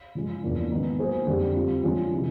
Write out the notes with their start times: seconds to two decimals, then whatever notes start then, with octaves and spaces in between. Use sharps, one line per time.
0.15 C#3 F3 G#3
0.43 E2 C#3 F3 A#3 D4
0.71 G#2 D#3 G#3 B3 D#4
0.99 F#3 A#3 D#4 G#4 C5
1.27 F2 D3 G3
1.56 G3 C4 F4
1.84 D3 F3 G#3 C#4 F4
2.13 C3 E3